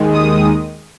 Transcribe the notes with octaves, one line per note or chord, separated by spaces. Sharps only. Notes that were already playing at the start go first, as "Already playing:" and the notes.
Already playing: D#2 D#3 G#3
D#6